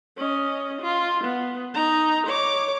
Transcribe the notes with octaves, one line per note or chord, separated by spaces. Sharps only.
C#4 D#5
F4
B3
D#4 A#5
C#5 D6